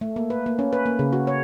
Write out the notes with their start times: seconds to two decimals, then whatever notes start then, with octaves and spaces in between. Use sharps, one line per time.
0.01 A3
0.16 A#3
0.30 B4
0.46 A#3
0.59 C#4
0.73 B4
0.86 A#3
0.99 C#3
1.13 F#4
1.27 C#5